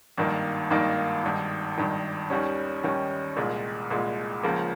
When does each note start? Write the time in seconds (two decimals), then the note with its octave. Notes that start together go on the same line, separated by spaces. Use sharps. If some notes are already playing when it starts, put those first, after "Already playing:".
0.18 G#1 G2 D#3 A#3
0.70 G#1 G2 D#3 A#3
1.24 G#1 G2 D#3
1.78 G#1 G2 D#3
2.30 D#2 D#3 G3 C#4
2.84 D#2 D#3 G3 C#4
3.37 C2 A#2 G#3
3.90 C2 A#2 G#3
4.43 C#2 C#3 F3 A#3